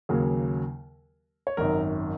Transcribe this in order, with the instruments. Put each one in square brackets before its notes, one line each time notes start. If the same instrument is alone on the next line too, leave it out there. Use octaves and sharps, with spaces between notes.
[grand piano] D#2 C#3 F#3 A#3 G#4
C#5
G#1 F#2 D#3 A#4